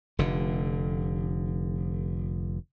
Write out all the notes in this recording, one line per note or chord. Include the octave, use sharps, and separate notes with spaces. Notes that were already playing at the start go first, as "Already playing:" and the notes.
F1 D3